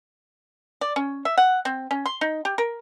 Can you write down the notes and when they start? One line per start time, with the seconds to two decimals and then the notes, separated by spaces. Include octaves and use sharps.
0.81 D5
0.96 C#4
1.25 E5
1.38 F#5
1.65 C4
1.91 C#4
2.06 C6
2.21 D#4
2.45 G4
2.58 A#4